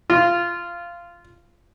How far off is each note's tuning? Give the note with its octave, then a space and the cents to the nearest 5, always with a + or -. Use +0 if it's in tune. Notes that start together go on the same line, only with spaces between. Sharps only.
F4 -15